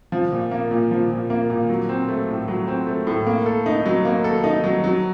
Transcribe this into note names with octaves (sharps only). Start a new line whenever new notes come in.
F3
A#2
A#3
A#2
F3
A#2
A#3
A#2
F#3
C4
A3
A2
F#3
C4
A3
A2
A#3
A4
D#4
F#3
A#3
A4
D#4
F#3
F#3